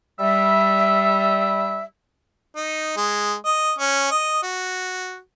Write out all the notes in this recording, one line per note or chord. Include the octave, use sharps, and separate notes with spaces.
G3 E5
D#4
G#3
D#5
C#4
D#5
F#4